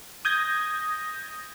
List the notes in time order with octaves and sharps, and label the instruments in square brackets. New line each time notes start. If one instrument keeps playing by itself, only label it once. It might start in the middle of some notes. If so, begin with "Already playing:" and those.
[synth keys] D#6 G6 G#6 A#6